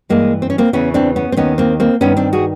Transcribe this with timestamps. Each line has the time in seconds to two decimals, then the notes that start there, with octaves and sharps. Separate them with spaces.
0.09 G2 E3 G#3 A#3
0.42 C4
0.50 C#4
0.58 A#3 C4
0.73 E2 C#3 E3 B3 C#4
0.94 C4 D4
1.16 B3 C#4
1.32 C4
1.37 D#2 D#3 B3 C#4
1.58 A#3 C4
1.80 A#3 C4
2.01 G2 D#3 B3 C#4
2.17 C4 D4
2.33 F#4 G#4